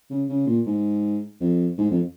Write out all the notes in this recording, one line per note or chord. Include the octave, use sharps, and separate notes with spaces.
C#3
C#3
A#2
G#2
F2
G#2
F2